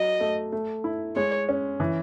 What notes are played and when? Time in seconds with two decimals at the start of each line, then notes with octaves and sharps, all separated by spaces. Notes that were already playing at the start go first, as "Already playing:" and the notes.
Already playing: F#3 D#5
0.21 A3
0.52 A3
0.84 E4
1.16 G#3 C#5
1.49 C#4
1.80 E3